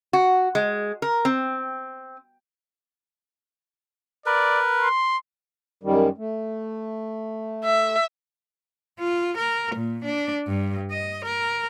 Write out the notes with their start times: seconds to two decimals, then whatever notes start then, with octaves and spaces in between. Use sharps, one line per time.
0.13 F#4
0.55 G#3
1.02 A#4
1.25 C4
4.26 A#4 B4 D5
4.80 C6
5.83 F#2 D#3 G3
6.17 A3
7.64 E5
8.99 F4
9.38 A#4
9.76 A#2
10.05 D4
10.47 G2
10.91 D#5
11.25 A#4